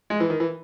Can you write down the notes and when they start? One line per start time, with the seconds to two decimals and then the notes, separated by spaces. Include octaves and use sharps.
0.10 G#3
0.20 E3
0.30 D#3
0.40 E3